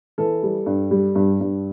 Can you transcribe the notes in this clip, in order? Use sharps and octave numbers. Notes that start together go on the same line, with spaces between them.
E3 A4
G3
G2
G3
G2
G2